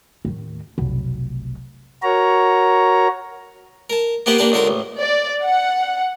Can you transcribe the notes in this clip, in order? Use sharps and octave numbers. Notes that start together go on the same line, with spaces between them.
D#2 A2
F1 B1
F#4 A#4 C#5 A#5
A#4 A5
A#3 B3 G4 B4 C5 G5
A#3 D4 G4 B4
C#2 D3 A4 A#4 C6
A1
D5
F#5